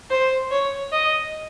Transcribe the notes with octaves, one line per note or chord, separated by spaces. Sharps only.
C5
C#5
D#5